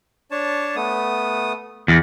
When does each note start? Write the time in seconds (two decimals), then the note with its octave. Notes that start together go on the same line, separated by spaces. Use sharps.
0.31 D4 C#5 A5
0.76 A3 B3 D#6
1.88 E2